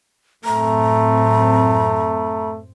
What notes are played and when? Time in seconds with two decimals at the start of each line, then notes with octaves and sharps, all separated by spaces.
0.45 F#2 A2 A3 C4 A#5